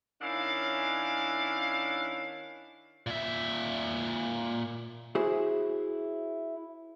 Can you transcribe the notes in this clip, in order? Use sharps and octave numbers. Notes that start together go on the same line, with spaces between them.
D#3 C#4 D4 E4 F5
A#2 E5
E4 F#4 G#4 C5